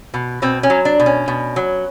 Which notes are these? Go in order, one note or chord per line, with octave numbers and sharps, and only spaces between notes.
B2
B2 C4
C#4
F#3
D4
B2
C#4
B2
F#3